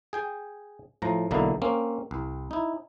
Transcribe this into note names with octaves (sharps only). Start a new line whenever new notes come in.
G#4 G5 G#5
A2 F3 A#5
B1 D3 A#3 D#4 E4
A#3 C4 C#4
C2
D#4 E4